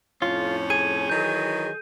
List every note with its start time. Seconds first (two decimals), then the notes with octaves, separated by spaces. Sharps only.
0.22 F2 A2 C#4 F4
0.70 G#4 D#7
1.10 D#3 E3 F#3 G6